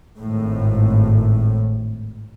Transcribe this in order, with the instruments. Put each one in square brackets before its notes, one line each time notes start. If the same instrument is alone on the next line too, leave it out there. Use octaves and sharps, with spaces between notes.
[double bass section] G#1 A2